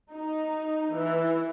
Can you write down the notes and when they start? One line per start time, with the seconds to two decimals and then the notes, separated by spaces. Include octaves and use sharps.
0.12 D#4
0.94 E3